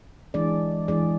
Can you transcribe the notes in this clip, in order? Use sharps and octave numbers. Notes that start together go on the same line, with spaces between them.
E3 G#3 D4 G#4 D5
E3 G#3 D4 G#4 D5